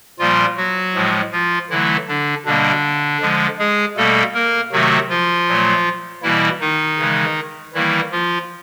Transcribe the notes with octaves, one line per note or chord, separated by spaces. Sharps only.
A#2 F3 G3 A#3 F4
F#3 F#4
A2 F3 G#3
F3 F4
D3 E3 F#3 A3 E4
D3 D4
B2 D3 G3 A#3 D4
D3 F3 G#3
G#3 G#4
B2 G3 A3 A#3 A4
A#3 A#4
C3 D#3 F#3 A3 F#4
F3 F4
A#2 F#3 A3
B2 E3 G3 A#3 E4
D#3 D#4
C#3 E3 G#3
D#3 E3 G3 A#3 E4
F3 F4